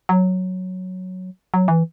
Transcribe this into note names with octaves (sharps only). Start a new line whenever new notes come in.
F#3
F#3
E3